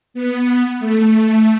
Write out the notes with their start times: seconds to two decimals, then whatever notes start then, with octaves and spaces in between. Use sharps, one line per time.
0.14 B3
0.79 A3